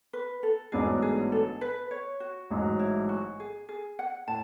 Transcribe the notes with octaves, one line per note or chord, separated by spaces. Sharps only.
B4
A4
A1 G#2 F#3 B3 D4 G#4
G#4
A4
B4
C#5
F#4
A1 G#2 F#3
E4
F#4
G#4
G#4
F#5
A2 A5